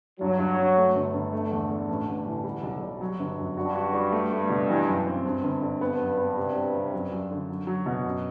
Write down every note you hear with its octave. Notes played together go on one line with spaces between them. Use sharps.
G2 F#3
G2
G2
A3
G1
G1
D3 A3
E2
A3
A1
A1
E3
G3
B1
G3
F#3
G1
F#2
G2 F#4
F#4
G3
A3
A3
B2
E3
F#2
C4
G2
G1
D3
G2 B3
F#2
B3
C3
G3
C3
F#2
F#2
D3
F#3
F#3
B2
F#2